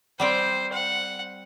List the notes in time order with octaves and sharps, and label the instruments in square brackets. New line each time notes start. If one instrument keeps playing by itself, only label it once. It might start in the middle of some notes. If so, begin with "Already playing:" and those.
[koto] G3 C4 G5 [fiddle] C5
[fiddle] F#5